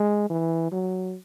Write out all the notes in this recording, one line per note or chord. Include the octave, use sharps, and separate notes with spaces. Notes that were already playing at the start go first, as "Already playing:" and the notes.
Already playing: G#3
E3
F#3